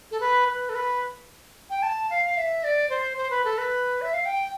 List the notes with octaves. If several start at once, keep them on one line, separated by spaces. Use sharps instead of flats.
A4
B4
B4
A4
B4
G5
A5
F5
F5
E5
D5
C5
C5
B4
A4
B4
E5
F5
G5